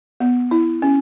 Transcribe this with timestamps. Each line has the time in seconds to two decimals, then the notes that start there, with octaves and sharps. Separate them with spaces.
0.20 B3
0.51 E4
0.82 C#4